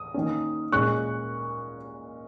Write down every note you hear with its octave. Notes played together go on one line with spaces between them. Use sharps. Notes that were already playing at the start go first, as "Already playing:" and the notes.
Already playing: D#6
D#3 A#3 C#4
A#2 G#3 C#4 C#6 F#6